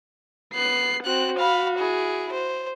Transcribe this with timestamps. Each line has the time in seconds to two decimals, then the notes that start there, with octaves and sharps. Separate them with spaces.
0.53 B3 F#6 C7
1.04 C4 F#4 F#6
1.37 F5 B5
1.78 E4 G#4
2.32 C5